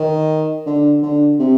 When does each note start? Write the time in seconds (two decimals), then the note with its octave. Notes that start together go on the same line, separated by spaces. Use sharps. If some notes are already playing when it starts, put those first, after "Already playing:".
Already playing: D#3
0.66 D3
1.03 D3
1.39 C3